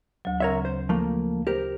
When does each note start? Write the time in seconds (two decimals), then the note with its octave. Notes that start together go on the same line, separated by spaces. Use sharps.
0.25 D2 F#3
0.40 C#3 C4 A#4 C#5 E5
0.65 C5
0.89 F3 A3 A#3
1.47 G4 A#4 C5